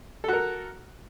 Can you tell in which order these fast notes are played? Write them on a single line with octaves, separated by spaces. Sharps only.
A4 F#4 A#4